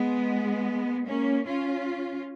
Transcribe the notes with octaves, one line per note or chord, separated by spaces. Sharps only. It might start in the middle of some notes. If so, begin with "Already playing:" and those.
Already playing: G#3 B3
A#3 C#4
C#4 F4